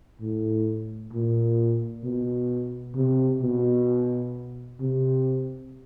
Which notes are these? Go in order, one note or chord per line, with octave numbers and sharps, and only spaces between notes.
A2
A#2
B2
C3
B2
C3